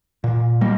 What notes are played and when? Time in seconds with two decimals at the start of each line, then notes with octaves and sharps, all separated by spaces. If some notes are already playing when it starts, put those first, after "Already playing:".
0.24 A#2
0.61 G3 A#3